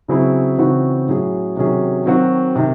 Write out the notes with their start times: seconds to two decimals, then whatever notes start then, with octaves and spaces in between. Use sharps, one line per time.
0.08 C#3 F#3 C4 E4 G#4
0.58 C#3 E3 C4 D#4 F#4
1.08 A2 F#3 C#4 G#4
1.57 C3 D#3 F#3 C#4 G#4
2.06 D#3 F#3 C4 F#4
2.56 C3 D#3